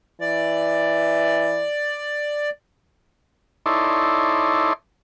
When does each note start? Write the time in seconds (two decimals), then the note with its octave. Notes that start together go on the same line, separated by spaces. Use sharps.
0.21 E3 D5
3.66 D#4 E4 A4 C#5 D5 C6